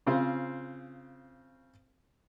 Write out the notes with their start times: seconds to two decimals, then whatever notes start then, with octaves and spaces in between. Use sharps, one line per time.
0.07 C#3 C4 F4 C5